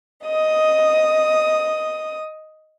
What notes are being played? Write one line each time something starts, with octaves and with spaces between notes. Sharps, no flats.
D#5 D#6